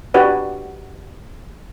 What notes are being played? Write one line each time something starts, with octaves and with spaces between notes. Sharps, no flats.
D4 F#4 G4 B4 D5